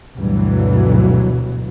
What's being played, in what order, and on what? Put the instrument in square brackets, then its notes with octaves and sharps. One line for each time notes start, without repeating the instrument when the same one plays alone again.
[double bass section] D2 G2 B2 E3 F#3